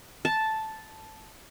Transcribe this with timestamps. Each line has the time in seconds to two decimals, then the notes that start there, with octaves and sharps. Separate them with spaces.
0.25 A5